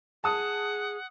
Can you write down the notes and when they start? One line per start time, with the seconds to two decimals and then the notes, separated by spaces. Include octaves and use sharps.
0.24 G#4 F#5 A5 D#6